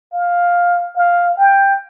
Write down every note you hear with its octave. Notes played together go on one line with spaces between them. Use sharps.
F5
F5
G5